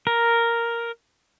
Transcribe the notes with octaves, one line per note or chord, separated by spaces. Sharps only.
A#4